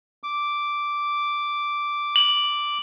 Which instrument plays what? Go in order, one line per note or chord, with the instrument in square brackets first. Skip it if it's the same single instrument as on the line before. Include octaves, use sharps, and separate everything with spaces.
[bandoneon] D6
[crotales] F#7